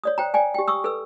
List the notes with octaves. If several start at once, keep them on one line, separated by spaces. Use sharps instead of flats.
C#5 D5 D#6
C5 G5 A#5
D5 G5 G#5
G4 G5
C#6 D#6 E6
A4 B4 E6